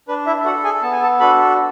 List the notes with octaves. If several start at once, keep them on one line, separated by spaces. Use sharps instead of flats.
D4 B4
E4 E5
E5
F#4 A4 F#5
G#4 G#5
B3 A5
G#5
A4 A5
D4 F#4 A4 B4 B5